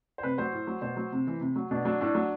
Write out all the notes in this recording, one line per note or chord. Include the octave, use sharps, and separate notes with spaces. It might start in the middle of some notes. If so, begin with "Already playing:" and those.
C5
C3 B4
F#3 C5
A2
F#3
B2 C5
F#3
C3
E3
C3
F#3
B2 D4
F#3 D4
A2 D4
F#3